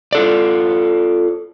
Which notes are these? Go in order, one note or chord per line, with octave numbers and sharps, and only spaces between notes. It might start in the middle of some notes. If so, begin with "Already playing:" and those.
F4 A4 D5